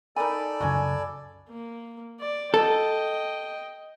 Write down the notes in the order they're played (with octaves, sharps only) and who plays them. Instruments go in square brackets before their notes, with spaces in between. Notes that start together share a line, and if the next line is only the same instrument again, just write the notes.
[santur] D#4 G5 B5 [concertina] A4 D5 [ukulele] A#4 G#5
[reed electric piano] C2 F#2 C#3 [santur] D4 G#5 [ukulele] F#4 D#5
[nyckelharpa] A#3
D5
[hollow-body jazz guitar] A4 [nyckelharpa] D#5 G5